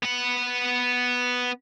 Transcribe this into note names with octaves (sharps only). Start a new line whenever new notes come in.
B3 F#5